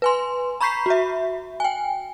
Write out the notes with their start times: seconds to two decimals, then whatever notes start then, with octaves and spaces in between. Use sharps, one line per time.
0.02 B4 G#5 C6
0.61 A#5 B5 C#6 G6 B6 C7
0.86 F#4 E5
1.60 G5 G#5